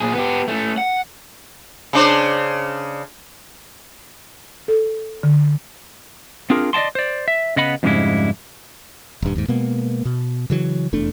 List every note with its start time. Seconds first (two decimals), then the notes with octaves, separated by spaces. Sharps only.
0.01 A#2 G#4
0.13 B3 G4
0.48 A3 C#4
0.78 F#5
1.93 C#3 D4 C5
4.68 A4
5.23 D3
6.50 C4 D4 F4 G#4 A#4
6.73 D5 D#5 G5 A5 C6
6.95 C5 D5
7.28 E5
7.56 C#3 B3 D#5 F#5 B5
7.83 F2 G#2 C#3 G3 G#3 E4
9.22 D#1 G2
9.35 D#2 G#2
9.48 B2 G#3 A#3 B3
10.05 B2
10.50 C#3 E3 F#3
10.93 F1 E2 A3 D4